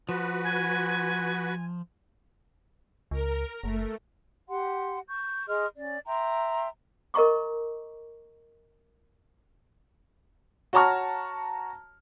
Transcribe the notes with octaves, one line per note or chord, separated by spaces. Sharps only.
F3 F#4 B4
G#5
C#2 A#4
F#1 A3
G4 F#5 C6
C#6 G6
G#4 D#5 C6 F6
C#4 D5
E5 G5 A#5 C6
A#4 D#5 A#5 C#6 D6
F#4 C#5 A5 A#5 C#6 F6